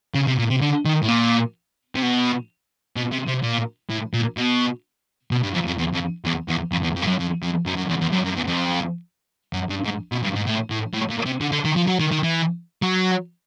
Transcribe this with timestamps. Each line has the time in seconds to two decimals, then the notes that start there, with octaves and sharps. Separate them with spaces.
0.15 C#3
0.27 C3
0.39 A#2
0.50 C3
0.61 D3
0.85 D#3
1.03 A2
1.08 A#2
1.96 C3
2.03 B2
2.97 B2
3.12 C3
3.28 C3
3.43 A#2
3.90 A2
4.14 A#2
4.37 B2
5.31 B2
5.43 G2
5.54 F2
5.67 F2
5.78 E2
5.93 F2
6.25 E2
6.48 E2
6.72 F2
6.83 E2
6.96 F2
7.02 G2
7.07 F#2
7.19 F2
7.43 F2
7.66 F#2
7.77 F#2
7.90 E2
8.02 E2
8.13 F#2
8.25 F#2
8.37 E2
8.47 F2
9.53 F#2
9.69 G2
9.84 G#2
10.12 B2
10.24 G2
10.36 G#2
10.47 A2
10.71 A2
10.94 A2
11.10 A#2
11.26 C3
11.41 D3
11.52 D3
11.65 D#3
11.76 F3
11.87 F#3
12.00 D#3
12.11 D#3
12.23 E3
12.82 F#3